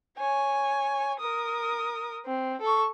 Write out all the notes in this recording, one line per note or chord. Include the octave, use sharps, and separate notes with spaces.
C#5 G#5
A#4 D#6
C4
A4 C#6